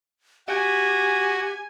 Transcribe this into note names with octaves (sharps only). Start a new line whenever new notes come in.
F#4 G4 G#5